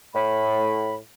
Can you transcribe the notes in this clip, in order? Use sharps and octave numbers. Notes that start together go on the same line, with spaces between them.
A2 B5